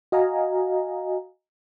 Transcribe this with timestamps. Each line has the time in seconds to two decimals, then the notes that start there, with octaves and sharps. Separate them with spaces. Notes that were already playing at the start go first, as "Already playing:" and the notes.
0.12 F#4 D#5 F5 G#5 A#5